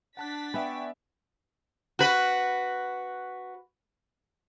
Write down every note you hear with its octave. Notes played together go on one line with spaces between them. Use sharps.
D4 F#5 A5 F#6 A6 B6
B3 D5 E5 G5 G#5 C#6
F#4 B4